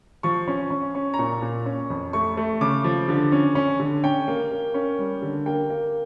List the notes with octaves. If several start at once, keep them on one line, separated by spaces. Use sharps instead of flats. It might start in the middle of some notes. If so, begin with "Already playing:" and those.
F3 C#6
C#4
C#4
C#4
A#5
A#2 C#6
A#2
C#4
F2
A3 C#6
A3
C#3 D6
F3
D3
C#4
C#4
D3
C#4 G5
A#3
A#3
C#4
G3
D3
A#3 G5
A#3